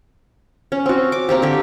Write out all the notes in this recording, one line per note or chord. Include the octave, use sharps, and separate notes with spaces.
C#4
C4 F#4
D6
A#3 C4 G4
D3 G4